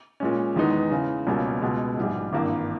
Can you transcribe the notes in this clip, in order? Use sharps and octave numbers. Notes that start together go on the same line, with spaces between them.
A#2 G#3 C#4
E2 D#3 G#3 B3 D#4
C#3 E3 G#3
C#2 B2 G3 A#3 C#4
C#2 B2 G#3
A#1 G#2 G3
G#1 G2 E3 A#3